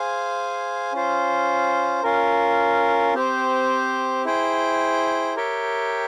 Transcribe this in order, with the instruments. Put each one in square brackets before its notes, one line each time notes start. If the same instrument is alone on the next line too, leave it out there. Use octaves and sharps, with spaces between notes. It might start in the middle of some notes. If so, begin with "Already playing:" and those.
Already playing: [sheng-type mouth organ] G#4 C5 F5 G#5
C#4 F4 C5
C#4 F4 A#4
C4 G4 C5
E4 G#4 C5 G5
G4 A#4 C#5 E5 G5